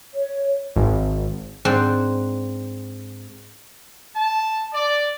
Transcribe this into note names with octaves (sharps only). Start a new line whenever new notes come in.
C#5
G#1
G#2 C4 D4 F#5
A5
D5